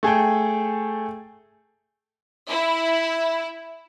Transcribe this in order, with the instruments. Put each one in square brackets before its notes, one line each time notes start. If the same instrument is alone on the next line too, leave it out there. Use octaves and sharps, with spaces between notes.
[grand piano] A3 G#4 A4 G5
[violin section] E4